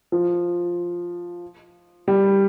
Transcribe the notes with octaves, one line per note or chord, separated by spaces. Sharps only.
F3
G3